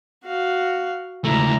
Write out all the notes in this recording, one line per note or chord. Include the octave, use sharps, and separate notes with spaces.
F#4 F5
C#2 A3 E4 A#5